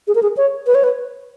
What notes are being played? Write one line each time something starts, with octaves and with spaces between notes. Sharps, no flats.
G#4
A#4
G#4
C#5
B4
C#5
B4